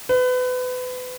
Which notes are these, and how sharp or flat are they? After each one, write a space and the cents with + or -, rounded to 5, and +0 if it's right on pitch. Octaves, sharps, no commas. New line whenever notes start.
B4 +30